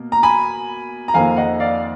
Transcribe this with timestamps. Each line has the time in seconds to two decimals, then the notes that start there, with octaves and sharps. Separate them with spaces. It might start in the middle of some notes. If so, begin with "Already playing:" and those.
Already playing: B2 A#3
0.12 A#5
0.23 G#5 B5
1.08 A#5
1.14 F2 D#3 A#3 F5 G#5
1.37 D#5 F#5
1.60 D5 F5